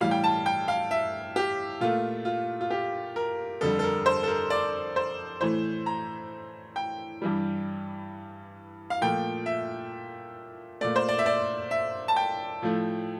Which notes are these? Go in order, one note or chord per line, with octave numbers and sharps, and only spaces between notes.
A2 E3 G3 F5
G5
A5
G5
F5
E5
G4
A#2 A3 F4
F4
F4
G4
A#4
F2 D3 G3 A4
A4
A#4
C5
A4
A#4
D5
C5
A2 E3 A3 C5
A#5
G5
G2 E3 G3
F5
A#2 F3 A3 G5
E5
A#2 A3 D5
C5
D5
E5
D5
E5
A5
G5
A2 F3 A3